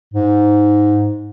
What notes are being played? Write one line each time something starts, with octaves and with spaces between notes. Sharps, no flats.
G#2